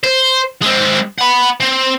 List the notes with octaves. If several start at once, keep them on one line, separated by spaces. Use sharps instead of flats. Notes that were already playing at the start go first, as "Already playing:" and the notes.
C5
G#3 C4
F#5 B5
C4